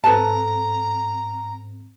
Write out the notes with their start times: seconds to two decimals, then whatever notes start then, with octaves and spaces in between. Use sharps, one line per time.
0.04 G#2 C4 A4 B4 A5 A#5